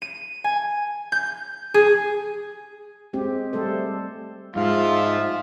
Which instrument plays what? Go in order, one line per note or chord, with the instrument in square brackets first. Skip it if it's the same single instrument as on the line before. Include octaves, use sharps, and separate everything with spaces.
[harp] D#7
G#5
G6
G#4
[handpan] G#3 C4 G4
G3 A3 A4 C5
[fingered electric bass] G#2 [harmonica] F3 F5 [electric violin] F4 E5